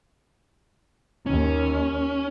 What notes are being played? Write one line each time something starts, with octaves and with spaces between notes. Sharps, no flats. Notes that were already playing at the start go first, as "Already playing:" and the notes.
D#2 C#4